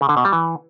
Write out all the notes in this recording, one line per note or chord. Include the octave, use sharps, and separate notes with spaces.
C#3
D3
B2
G3
E3